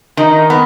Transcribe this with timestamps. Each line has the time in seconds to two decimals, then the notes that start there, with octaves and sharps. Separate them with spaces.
0.17 D#3 D#4
0.50 B3